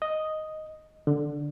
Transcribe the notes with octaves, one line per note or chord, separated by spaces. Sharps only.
D#5
D3